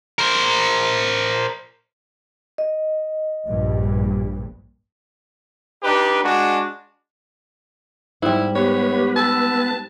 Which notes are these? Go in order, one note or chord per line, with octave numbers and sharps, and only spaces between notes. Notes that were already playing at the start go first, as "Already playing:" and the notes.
A#4 C5
D#5
A#1 G2
D4 D#4 G4 B4
G#3 D4 F#4
G#2 G3 E4
B3 G4 B4 C#5
A5 E6